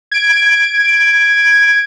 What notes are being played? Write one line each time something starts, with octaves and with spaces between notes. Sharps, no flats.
G#6 D7